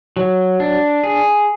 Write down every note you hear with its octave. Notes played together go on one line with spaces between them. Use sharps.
F#3
D4
G#4